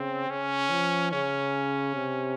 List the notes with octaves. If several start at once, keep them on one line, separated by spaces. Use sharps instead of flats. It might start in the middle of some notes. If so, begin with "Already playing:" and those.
Already playing: C#3 C4
C#3 C#4
F3
C#3 C#4
C3